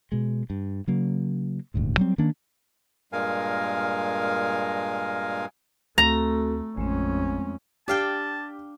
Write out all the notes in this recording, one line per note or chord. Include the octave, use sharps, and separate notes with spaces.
B2 G#3
G2
C#3 F#3 A#3
D#1 D2 G#2
F#3 G3 C4
D#3 A#3 C#4 D4
G2 A#2 G#3 A#4 F5 G#5
D2 A3 C4 F#4 A4 A#5
A1 F2 G#3 A3 C4 C#4
D4 G4 F5 G5 A5